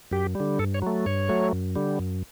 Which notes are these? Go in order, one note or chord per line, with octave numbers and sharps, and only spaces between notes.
F#2 G4
D3 G3
G2 A4
C#5
F#3 A3
G2 C#5
F#3 A3
F#2
D3 G3
F#2